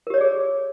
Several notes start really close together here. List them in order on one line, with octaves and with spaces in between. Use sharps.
A#4 G4 C#5 D5 G#4